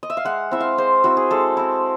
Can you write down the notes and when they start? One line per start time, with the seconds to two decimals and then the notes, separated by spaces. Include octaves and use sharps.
0.03 D#5
0.10 E5
0.17 F5
0.25 G#3 F#5
0.51 C4 E4 E5
0.60 F5
0.78 G#3 C5
1.04 C4 E4 F#4
1.17 G#4
1.31 G#3 A4
1.57 C4 E4